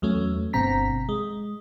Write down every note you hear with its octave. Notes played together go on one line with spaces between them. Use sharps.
E2 F#3 A3 C#4
G1 B2 C4 A#5 B6
G#3